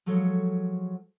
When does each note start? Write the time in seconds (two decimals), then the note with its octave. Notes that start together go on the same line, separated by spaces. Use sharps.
0.06 F3 F#3 G#3 A4 C#5